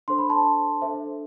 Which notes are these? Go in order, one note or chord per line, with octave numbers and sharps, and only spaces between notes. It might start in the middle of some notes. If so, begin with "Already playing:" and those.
D4 A4 C5 C6
B5
A5 C6
D4 A4 C5 E5